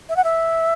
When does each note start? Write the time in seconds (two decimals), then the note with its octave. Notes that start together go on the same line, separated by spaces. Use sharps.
0.09 E5
0.17 F#5
0.24 E5